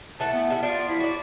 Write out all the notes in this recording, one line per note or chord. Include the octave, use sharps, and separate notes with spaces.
E3 A3 F#5 A5
B3
G3 E4
F3 D4 F4 D5
E4
F#4 D5